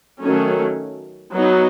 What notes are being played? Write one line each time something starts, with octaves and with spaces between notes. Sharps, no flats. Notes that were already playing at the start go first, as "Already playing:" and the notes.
D#3 F#3 A3 C#4
F#3 B3 D#4